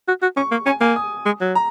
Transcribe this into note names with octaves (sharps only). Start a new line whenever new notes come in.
F#4
F#4
C#4 C#6
A#3
C#4 G#5
A#3 G#5
D#6
G#3
F#3
A#5